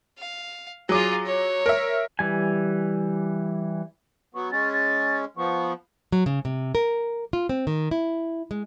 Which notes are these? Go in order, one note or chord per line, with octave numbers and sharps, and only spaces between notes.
F5
F#3 F4 G#4 D6
C#5
A#4 E5
E3 G3 G#5
F#3 B3 C#6
G#3 C#4 A6
A6
F3 B3 C#6
F#3
C#3
C3
A#4
F4
C4
D#3
E4
G#3